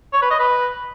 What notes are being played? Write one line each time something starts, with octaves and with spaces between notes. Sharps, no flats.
C#5
B4
D#5
B4